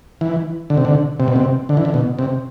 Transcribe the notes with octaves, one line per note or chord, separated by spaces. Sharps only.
E3
D3
C3
D3
C3
B2
C3
D3
E3
D3
B2
C3